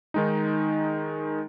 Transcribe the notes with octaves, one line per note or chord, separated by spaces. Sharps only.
D#3 G#3 D#4